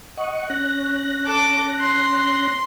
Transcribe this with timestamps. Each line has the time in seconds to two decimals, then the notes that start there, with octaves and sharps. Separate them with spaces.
0.17 D#5 F#5 C#6
0.50 C#4 F#6 A#6
1.25 A4 D6
1.80 C6